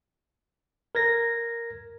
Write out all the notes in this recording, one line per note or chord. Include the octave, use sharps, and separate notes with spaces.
A#4 G#6 A#6